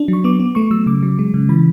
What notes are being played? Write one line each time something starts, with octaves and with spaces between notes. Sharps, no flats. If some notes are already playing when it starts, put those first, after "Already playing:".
Already playing: D4
F#3 C#6
B3 D6
B3
A3 C#6
F#3 E6
C#3 D6
F#3
G#3
C#3
E3 B5